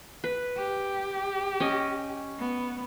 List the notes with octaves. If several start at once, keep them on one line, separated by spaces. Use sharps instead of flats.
B4
G4
C#4 D#5
B3